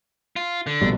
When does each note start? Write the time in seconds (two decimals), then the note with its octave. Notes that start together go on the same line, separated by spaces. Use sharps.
0.36 F4
0.67 D3
0.82 A#1 B2 G3